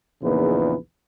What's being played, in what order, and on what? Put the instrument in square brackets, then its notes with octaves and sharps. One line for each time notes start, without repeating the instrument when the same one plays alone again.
[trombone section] A#1 E2 A#2 C#3 D#4 B4